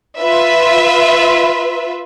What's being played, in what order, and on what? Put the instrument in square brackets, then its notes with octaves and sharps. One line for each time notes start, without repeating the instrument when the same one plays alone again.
[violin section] F4 B4 E5